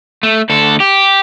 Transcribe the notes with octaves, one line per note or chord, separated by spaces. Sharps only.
A3
D2 A4
G4